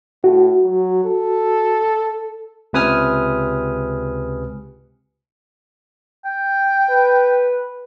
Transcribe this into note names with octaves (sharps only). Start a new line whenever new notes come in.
A2 F#4
F#3
A4
C#2 C3 B4 G#5 D#6 F6
G5
B4